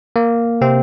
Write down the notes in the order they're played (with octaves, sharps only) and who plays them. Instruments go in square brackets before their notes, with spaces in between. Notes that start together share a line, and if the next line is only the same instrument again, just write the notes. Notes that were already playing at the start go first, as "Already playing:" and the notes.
[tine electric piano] A#3
C3 C4